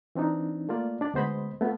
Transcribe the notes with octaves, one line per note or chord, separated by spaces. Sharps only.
E3 C4 D4 D#4
A3 A#3 F4 D5
D4 D5
D2 G#3 B3 C5 D#5 B5
A3 B3 C4 F4